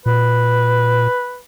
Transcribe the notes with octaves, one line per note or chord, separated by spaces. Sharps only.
A#2 B4